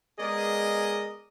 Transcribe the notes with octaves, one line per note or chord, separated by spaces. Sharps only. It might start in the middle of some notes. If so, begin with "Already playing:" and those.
G#3 B3 G#4 A#4 D5 D#5